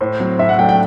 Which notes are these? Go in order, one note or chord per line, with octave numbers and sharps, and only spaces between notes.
A2 C5
F#3 C4
A2 E5
F#5
F#3 A3 D4 G5
G5